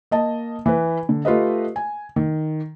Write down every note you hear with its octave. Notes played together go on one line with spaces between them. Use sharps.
A#3 D#5 A5
E3 B4
D3
A3 F4 G4 B4 D#5
G#5
D#3